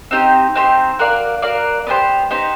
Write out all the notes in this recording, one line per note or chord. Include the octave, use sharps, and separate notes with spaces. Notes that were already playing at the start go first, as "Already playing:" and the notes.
C4 D#4 G4 C5
C4 D#4 G4 C5
F#4 A#4 D5 F5
F#4 A#4 D5 F5
B3 D#4 G4 C5
B3 D#4 G4 C5